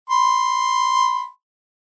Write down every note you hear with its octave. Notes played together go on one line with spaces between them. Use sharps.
B5 C6